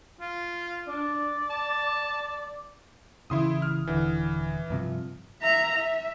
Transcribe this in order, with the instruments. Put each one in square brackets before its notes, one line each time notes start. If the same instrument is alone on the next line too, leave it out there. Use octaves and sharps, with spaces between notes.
[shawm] F4
[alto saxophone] D4 [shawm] D5
[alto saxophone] A5
[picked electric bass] A1 C#3 E3 [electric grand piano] E4 C6 D#6
[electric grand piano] F6
[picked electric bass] D#1 D3 [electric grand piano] E3
[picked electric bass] G2 C3 F3
[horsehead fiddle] E5 A#5
E5